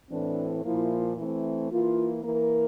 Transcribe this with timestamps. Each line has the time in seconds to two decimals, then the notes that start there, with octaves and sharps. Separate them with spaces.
0.11 A2 E3 A3 C4 D4
0.64 A#2 F3 A#3 E4
1.17 E3 A3 C4
1.71 E3 A#3 F4
2.24 E3 A#3 A#4